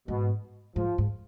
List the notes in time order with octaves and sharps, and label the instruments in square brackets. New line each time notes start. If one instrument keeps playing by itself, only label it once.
[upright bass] G#2 [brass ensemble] B2
[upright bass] G#2 [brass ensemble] F3
[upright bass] G#2